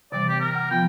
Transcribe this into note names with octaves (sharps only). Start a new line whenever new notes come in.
C3 E3 G3 D5
B3 G4
A#4
F#5
F3 B3 F4 G5